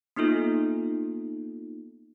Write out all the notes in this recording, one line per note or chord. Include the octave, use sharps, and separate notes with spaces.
A#3 B3 D#4 F4 A4